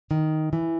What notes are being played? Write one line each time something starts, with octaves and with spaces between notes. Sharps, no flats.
D#3
E3